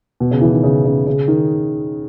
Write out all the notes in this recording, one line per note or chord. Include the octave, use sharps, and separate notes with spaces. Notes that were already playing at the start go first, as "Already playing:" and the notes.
B2
C#3
E3
D#3
C#3
C#3
C#3
D#3